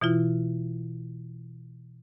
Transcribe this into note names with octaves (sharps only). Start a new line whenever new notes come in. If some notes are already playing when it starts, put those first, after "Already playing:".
B2 E3 E4 F4